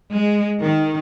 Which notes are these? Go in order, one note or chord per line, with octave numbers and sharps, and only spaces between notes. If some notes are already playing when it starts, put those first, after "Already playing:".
G#3
D#3